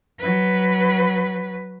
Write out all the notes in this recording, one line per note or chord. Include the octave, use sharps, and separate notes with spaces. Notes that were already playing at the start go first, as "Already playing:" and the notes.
F#3 B4